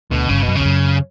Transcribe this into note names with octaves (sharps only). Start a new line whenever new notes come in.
D2 B2 D3
G1 G2 C#3
F#2 B2
E2 C#3
F#2